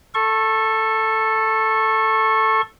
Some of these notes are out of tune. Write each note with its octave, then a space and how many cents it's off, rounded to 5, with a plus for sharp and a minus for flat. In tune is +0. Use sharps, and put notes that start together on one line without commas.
A4 +5 C#6 -25